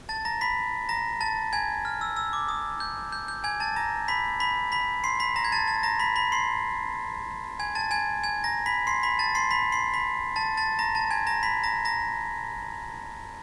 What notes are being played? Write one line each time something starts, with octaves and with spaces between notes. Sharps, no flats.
A5 A6
A#5 A#6
B5 B6
A#5 A#6
A5 A6
G#5 G#6
F6
E6
E6
D6
D#6
G6
G6
G6
G#5 G#6
A5 A6
A#5 A#6
B5 B6
B5 B6
B5 B6
C6 C7
B5 B6
A#5 A#6
G#6
A5 A6
A5 A6
A#5 A#6
B5 B6
B5 B6
C6 C7
G#5 G#6
A5 A6
G#5 G#6
G#5 G#6
A#5 A#6
B5 B6
C6 C7
B5 B6
A5 A6
C6 C7
B5 B6
C6 C7
B5 B6
A5 A6
A5 A6
A#5 A#6
A5 A6
G#5 G#6
A#5 A#6
B5 B6
A#5 A#6
A#5 A#6